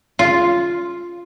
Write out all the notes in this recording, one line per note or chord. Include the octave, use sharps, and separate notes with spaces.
F4